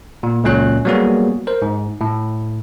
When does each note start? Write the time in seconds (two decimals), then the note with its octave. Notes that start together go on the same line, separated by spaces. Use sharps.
0.23 A#2
0.44 C#2 A#2 F#3 C#4 F#6
0.85 F#3 G3 A#3 B3 F#4 G#4
1.47 A#4 C5
1.62 G#2
2.01 A2